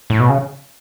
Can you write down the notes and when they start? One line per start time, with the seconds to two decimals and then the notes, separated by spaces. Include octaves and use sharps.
0.10 A2
0.20 B2
0.29 C#3